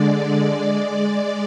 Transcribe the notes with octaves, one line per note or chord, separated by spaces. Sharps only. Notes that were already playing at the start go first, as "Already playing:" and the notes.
Already playing: D3 G#3 D5
D5
G#3